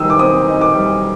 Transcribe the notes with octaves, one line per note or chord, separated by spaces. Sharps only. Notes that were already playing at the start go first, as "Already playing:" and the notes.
Already playing: D#3 G3 D#6 E6
D6
C4 D#6
D#4
D6
G3